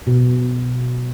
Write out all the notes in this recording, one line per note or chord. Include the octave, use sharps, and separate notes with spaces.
B2